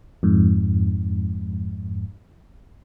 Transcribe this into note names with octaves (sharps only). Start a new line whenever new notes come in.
F2 G#2